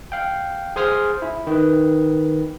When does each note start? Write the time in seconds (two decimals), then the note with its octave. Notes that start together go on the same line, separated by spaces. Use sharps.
0.12 F5 G5
0.76 G#4 C5 G#5 C6 D#6 F6
1.22 E4
1.47 D#3 B4